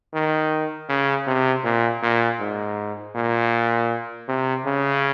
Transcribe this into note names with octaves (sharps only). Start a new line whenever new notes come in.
D#3
C#3
C3
A#2
A#2
G#2
A#2
C3
C#3